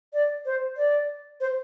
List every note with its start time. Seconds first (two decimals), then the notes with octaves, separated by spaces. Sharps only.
0.13 D5
0.45 C5
0.76 D5
1.40 C5